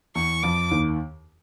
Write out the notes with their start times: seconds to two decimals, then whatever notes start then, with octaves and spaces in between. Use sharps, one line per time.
0.15 E2 E3 C#6
0.43 F2 F3 D6
0.71 D#2 D#3